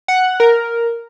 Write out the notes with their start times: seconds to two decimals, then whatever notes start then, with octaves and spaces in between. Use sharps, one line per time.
0.08 F#5
0.40 A#4